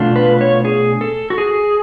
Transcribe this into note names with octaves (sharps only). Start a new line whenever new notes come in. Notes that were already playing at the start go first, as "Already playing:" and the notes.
Already playing: B2 A3 D4 F4
B4
C#5
G#4
A4
F#4
G#4